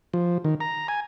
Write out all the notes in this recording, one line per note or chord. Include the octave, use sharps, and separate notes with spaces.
F3
D#3
A#5
G#5